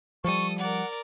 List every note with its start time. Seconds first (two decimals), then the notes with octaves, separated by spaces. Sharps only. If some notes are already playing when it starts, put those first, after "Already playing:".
0.24 F3 G3 A4 C#6 D#6
0.59 A#4 D5 F#5